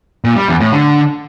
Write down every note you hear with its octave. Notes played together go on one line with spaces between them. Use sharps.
A#2
G3
E2
A2
D3